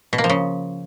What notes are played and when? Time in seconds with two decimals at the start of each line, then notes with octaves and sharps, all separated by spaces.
0.13 B2
0.18 A#3
0.24 F3
0.29 C#3